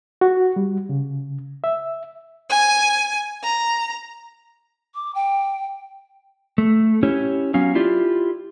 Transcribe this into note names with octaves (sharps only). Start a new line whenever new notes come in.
F#4
G3
C#3
E5
G#5
A#5
D6
G5
A3
C#4 E4 G4 C#5
F#3 B3 C#4 F5 G#5
E4 F4 G4 D5